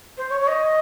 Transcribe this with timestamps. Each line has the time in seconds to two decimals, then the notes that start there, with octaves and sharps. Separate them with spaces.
0.17 C5
0.29 C#5
0.40 C#5
0.47 D#5